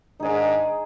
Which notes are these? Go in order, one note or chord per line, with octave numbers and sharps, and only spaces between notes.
G#2 D#3 D4 D#4 G#4